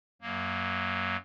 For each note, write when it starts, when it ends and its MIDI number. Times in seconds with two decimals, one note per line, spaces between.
0.22 1.16 42
0.22 1.16 54
0.22 1.16 58